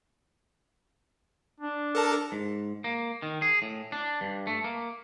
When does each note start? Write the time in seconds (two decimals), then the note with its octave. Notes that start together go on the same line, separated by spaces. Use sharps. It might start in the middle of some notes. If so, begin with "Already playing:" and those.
1.60 D4
1.95 A4 A#4 A5
2.32 G#2
2.84 A#3
3.22 D#3
3.42 G#4
3.62 A2
3.92 D4
4.21 G2
4.47 A3
4.64 A#3